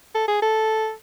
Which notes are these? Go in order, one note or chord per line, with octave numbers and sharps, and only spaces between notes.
A4
G#4
A4